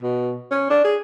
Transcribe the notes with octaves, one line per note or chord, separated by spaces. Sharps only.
B2
C#4
D4
G#4